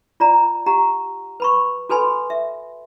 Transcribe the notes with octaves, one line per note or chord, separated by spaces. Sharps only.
F4 D5 A#5
G4 F#5 A#5
B4 B5 C#6
F#4 A4 B4 G#5 B5 C6
E5